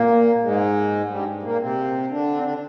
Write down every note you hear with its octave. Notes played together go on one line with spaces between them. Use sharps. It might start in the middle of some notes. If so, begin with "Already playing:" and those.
Already playing: A#2 A#3
G#2 G#3
G2 G3
A#2 A#3
C3 C4
D3 D4
C4
D3 D4